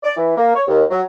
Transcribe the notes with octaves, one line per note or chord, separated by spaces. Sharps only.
D5
E3
A#3
C#5
D#2
F#3